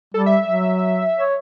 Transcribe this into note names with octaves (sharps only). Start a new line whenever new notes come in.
G3 A4
E5
F#3
C#5